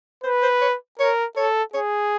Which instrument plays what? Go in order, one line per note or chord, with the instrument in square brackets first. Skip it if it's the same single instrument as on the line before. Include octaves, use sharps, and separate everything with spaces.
[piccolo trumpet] B4 [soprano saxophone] C5
[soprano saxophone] C5
C#5
[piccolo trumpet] A#4 [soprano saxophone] C#5
[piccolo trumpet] A4 [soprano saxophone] C#5
[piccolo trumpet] G#4 [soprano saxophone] C#5